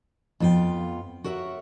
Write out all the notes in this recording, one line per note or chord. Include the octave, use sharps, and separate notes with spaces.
F2 B3 F4 F#4 G5
F#4 A#4 C#5 E5 F#5